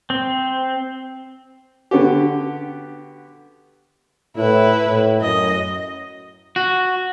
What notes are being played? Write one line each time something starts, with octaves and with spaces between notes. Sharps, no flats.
C4
D3 B3 F#4 G4
A2 E4 B4
A2
F#2 D#5
F#4